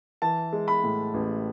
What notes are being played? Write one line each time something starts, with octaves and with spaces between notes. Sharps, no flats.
E3 A5
G#3
B5
A2
A1